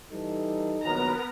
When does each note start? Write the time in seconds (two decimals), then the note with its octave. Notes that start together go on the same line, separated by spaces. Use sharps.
0.11 E3 G3 D#4 A4
0.84 A#1 D#3 F#3 B3 A#4 B4 A#5